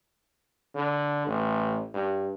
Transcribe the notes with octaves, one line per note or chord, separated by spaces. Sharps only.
D3
A1
G2